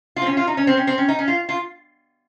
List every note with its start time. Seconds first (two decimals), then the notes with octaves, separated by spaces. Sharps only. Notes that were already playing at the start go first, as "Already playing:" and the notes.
0.16 F4
0.22 C4
0.26 C#4
0.37 F4
0.47 D#4
0.57 C#4
0.67 C4
0.77 C#4
0.87 C4
0.98 C#4
1.08 D#4
1.19 C#4
1.28 F4
1.49 F4